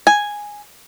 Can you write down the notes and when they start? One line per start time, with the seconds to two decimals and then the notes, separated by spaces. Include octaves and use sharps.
0.07 G#5